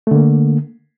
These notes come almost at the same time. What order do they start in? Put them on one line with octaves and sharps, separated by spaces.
A3 D3 A#3